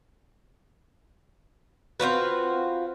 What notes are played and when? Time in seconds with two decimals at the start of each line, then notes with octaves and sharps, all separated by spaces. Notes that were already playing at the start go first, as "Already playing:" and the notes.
2.00 C4 F4 F#4 B4